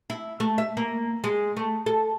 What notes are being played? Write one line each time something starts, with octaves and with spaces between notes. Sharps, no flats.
E4
A3
E5
A#3
G#3
A3
A4